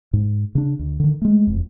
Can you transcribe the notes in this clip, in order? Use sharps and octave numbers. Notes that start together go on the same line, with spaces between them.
G#2
C#3 D4
D2
D3 D#3
G#3 A3
E1 F2